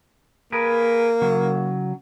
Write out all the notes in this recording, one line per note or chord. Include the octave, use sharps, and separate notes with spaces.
A#3 G#4 A#4 B4
C#3 F#3